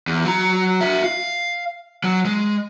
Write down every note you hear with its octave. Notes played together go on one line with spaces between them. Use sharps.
E2
F#3 A#5
F#4 E5
F5
F#3
G#3